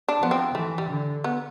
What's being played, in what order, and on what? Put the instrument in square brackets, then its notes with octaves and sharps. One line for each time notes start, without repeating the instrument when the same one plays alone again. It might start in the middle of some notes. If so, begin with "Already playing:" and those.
[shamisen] D4
[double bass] F3 [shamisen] B3
[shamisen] C4
[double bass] E3 [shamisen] A3
[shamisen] G3
[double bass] D3
[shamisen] B3